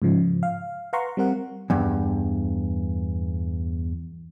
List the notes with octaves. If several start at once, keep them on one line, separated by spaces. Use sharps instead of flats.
G#2 C#3 F3
F5
B4 F5 F#5 A#5 C6 C#6
G3 C4 A#4 F#5
E2 G2